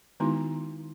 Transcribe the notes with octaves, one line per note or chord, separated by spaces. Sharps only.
D#3 G#3 B3 D#4 E4 F#4